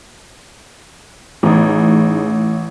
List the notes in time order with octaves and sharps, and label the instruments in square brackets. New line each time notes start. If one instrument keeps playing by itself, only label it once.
[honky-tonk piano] A1 [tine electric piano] C#4 D#4 G#4